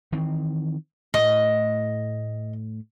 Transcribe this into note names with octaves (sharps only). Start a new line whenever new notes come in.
D#3 E3 C4
A2 A3 D#5